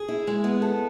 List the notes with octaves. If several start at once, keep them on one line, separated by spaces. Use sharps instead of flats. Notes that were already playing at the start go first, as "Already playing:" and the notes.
Already playing: G#4
E4
G#3
B3
A4